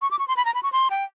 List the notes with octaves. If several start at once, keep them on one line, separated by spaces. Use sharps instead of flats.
C#6
D6
C#6
C6
B5
A#5
B5
C#6
C6
G5